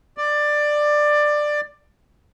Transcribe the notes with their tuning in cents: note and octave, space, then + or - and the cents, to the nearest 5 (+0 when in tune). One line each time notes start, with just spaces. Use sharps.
D5 +15